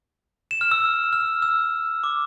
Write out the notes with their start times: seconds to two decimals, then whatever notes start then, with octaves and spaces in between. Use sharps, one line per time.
0.51 E7
0.61 F6
0.71 E6
1.13 F6
1.42 E6
2.04 D6